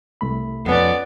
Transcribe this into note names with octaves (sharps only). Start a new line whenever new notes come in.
C2 A3 B5
F2 B3 C#4 D5